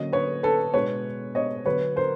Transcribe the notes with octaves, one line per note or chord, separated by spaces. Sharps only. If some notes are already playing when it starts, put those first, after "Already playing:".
Already playing: D3 F#3 A#3 C#4 D#5
B4 C#5
A4 B4
B2 G#3 B3 D4 B4 C#5
C#5 D#5
D3 F#3 B3 B4 C#5
A#4 C5